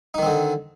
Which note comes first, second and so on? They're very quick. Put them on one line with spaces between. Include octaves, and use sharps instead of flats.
D#4 D#3 C4 D3